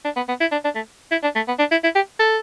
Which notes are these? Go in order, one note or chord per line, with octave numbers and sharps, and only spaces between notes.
D4
B3
B3
E4
D4
D4
A3
E4
D4
A3
B3
D4
E4
E4
G4
A4